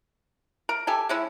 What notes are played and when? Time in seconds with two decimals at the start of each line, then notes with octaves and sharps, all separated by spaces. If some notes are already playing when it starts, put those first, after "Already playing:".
0.69 A#4
0.87 G4 A4 G#5
1.09 G#3 C#4 E4